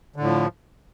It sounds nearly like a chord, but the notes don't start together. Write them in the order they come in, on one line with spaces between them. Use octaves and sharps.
D3 A2 F3